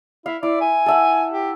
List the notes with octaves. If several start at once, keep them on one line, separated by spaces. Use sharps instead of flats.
E4 F5
E4 D5
G#5
A4 E5 F#5
G4